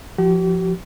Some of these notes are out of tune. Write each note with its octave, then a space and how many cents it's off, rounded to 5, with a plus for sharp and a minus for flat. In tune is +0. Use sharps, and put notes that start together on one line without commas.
F3 +0 G4 -45